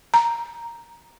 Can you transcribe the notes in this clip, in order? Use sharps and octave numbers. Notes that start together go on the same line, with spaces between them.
A#5